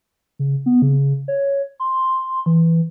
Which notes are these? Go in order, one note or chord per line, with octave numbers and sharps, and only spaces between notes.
C#3
B3
C#3
C#5
C6
E3